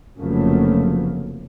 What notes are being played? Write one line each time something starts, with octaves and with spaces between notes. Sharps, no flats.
F1 C#3 F3 F#3 A3 A#3